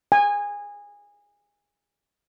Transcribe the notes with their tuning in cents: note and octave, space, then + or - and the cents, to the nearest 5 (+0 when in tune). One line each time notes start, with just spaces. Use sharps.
G#5 -20